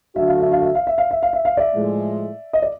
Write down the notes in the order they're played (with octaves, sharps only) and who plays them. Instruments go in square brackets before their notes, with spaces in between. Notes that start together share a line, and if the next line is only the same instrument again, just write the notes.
[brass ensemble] D3 F#3 A3 D4 F#4 [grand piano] E5
[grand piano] F5
E5
F5
E5
F5
E5
F5
E5
F5
E5
F5
D5 E5
[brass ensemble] A2 F3 G#3
[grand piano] D#5
D5